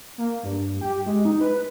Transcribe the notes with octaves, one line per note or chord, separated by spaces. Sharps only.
A#3
G2
G4
G#3
D#4
B4